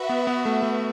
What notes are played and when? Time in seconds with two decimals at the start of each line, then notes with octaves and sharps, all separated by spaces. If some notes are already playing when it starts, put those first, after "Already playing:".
Already playing: F#4 B4 E5
0.09 B3
0.27 B3
0.45 A3
0.63 A3